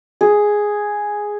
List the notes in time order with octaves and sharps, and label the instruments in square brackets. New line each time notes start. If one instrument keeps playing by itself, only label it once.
[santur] G#4